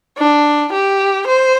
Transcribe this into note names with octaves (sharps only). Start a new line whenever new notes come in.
D4
G4
C5